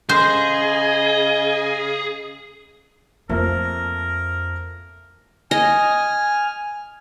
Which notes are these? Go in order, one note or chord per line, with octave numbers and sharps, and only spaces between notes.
C#3 G#4 C5 D#5
F2 F3 A3 A#3 F4 A#4
D#5 G#5 F6